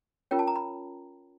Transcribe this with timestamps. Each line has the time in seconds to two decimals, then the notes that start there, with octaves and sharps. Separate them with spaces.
0.31 C#4 F4 A#4 C#5 G5
0.39 A5
0.47 A#5
0.56 B5